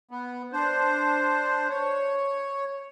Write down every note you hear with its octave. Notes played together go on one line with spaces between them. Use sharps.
B3
D4 C5
C#5